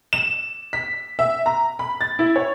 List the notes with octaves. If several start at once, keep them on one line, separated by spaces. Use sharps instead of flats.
E7
B6
E5
A#5
B5
A6
E4
C#5